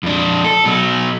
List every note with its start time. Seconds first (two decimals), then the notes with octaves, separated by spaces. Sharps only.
0.03 F2 D4
0.44 A4
0.65 B2 F#3